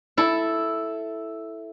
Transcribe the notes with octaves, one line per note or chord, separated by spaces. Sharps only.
E4 A4